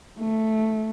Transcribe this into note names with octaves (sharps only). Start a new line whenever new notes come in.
A3